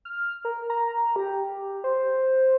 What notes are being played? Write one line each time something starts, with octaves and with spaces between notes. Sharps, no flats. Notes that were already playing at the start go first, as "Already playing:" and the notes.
F6
A#4
A#5
G4
C5